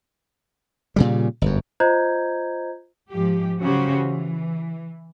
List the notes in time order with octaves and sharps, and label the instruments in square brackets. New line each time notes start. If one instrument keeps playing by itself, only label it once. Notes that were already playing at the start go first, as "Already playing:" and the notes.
[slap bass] A#2 C#3 G3
G1 F#2
[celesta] F4 C5 D#5 A#5 G6 G#6
[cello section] G#2 F3 G4
C#3 F#3 C#4 F#4 G4 C5
E3